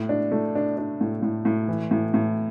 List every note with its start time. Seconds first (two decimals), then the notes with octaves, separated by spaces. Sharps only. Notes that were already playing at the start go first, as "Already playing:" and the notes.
Already playing: A2
0.09 D4
0.32 A3
0.55 D4
0.78 D4
1.01 A2
1.22 A2
1.45 A2
1.68 E3
1.91 A2
2.14 A2